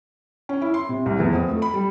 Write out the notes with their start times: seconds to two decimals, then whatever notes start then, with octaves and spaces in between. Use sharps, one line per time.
0.49 C#4
0.62 E4
0.74 C6
0.89 C3
1.06 C2
1.20 E2
1.32 F2
1.49 A3
1.62 B5
1.74 G3